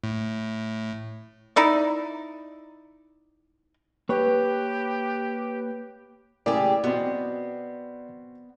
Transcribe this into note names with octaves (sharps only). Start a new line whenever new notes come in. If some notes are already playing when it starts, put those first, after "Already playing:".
A2
D#4 E4 D5
A#3 G4 B4 C#5
A2 C#3 A#3 G4 G#4 D5
B2 B3 C4